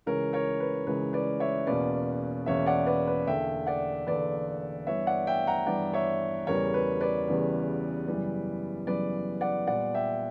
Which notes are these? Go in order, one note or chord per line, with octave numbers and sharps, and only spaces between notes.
C#2 C#3 E3 A#4 C#5
A#4 C#5
B4
C#2 C#3 E3 B4
B4 D5
C#5 E5
E2 B2 A#3 C#4 B4 D5
E2 B2 A#3 C#4 C#5 E5
D5 F#5
B4 D5
B4
E2 D3 A#3 E5 G5
D5 F#5
E2 D3 A#3 B4 D5
G2 E3 B3 C#5 E5
D5 F#5
E5 G5
F#5 A#5
G2 E3 B3 D5 F#5
C#5 E5
E2 C#3 E3 G3 B3 A#4 C#5
B4
B4 D5
E2 C#3 E3 G3 B3
F#2 C#3 E3 G3 B3
F#2 C#3 E3 G3 B3 B4 D5
D5 F#5
A#2 G3 B3 D5 F#5
E5 G5